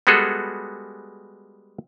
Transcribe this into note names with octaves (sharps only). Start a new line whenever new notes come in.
G3 G#3 B3 F#4 G#4 A4